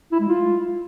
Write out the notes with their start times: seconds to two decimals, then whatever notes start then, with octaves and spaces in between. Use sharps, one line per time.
0.12 E4
0.20 G#3
0.28 F4